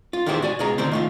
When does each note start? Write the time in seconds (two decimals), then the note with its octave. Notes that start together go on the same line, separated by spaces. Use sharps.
0.13 F4
0.26 D#3 E3 B3 G4 G#4 C5
0.42 F#4 D5 G#5
0.59 C#2 B2 G#4 A#5
0.78 D3 A3 C4 F#4 A#4 C5
0.92 D#3 A3 F4